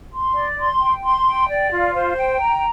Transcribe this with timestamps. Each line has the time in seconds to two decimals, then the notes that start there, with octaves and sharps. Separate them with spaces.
0.13 C6
0.35 D5
0.59 C6
0.81 G5
1.04 C6
1.26 G5
1.48 D5
1.71 F4
1.94 C5
2.17 G5
2.40 A#5